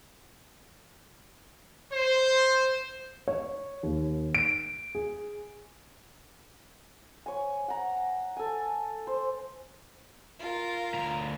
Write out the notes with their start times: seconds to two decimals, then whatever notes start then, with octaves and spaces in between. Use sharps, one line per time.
1.92 C5
3.28 C#5
3.83 D#2
4.35 D7
4.95 G#4
7.26 C#5 G#5
7.68 F#5 A#5
8.37 A4 G#5
9.07 C5
10.40 F4 A#4
10.94 D2 A#5